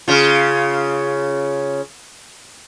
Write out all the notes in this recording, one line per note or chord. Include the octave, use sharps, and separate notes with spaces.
C#3 F4